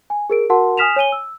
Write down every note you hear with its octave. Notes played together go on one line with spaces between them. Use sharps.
G#5
G#4 A#4 D7
F#4 A#4 F#5 A5 C6
G#5 D#6 F6 B6 E7 F7
C#5 G#5 D#7 G7
E6